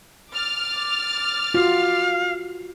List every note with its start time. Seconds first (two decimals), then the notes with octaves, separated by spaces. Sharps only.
0.32 D6 F6 A6
1.54 F4 F#4 F5